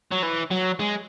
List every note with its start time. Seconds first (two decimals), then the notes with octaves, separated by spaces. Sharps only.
0.11 F#3
0.22 E3
0.51 F#3
0.80 G#3